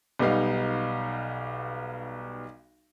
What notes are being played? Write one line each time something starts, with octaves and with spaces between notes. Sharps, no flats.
B1 G3 B3 D#4 F5